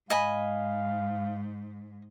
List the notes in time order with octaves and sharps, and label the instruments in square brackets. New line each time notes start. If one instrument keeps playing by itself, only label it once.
[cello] G#2 [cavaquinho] D#5 G#5 B5 [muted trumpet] F5